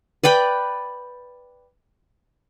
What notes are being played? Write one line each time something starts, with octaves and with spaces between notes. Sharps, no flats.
B4 D5 G5 B5